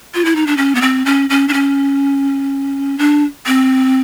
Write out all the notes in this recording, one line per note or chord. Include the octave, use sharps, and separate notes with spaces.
F4
E4
D#4
D4
C#4
B3
C4
C#4
C#4
D4
C#4
D4
C4